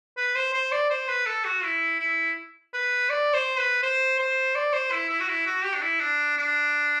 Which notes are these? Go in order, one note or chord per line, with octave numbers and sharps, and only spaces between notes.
B4
C5
C5
D5
C5
B4
A4
F#4
E4
E4
B4
D5
C5
B4
C5
C5
D5
C5
E4
E4
F#4
E4
F#4
G4
D4
E4
D4
D4